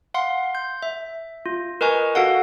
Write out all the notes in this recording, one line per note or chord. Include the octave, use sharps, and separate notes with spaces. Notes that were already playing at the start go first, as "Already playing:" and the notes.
F5 F#5 C6
G6
E5
F4
A#4 B4 D#5 G#5 C#6
F#4 A4 F5 F#5